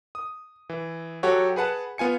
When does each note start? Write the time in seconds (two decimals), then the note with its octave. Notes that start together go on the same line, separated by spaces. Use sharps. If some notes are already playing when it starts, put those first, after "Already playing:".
0.15 D#6
0.69 E3
1.23 F#3 F#4 G4 A4 C#5
1.56 G#4 B4 F#5 A5
1.98 B3 F4 G#5 C#7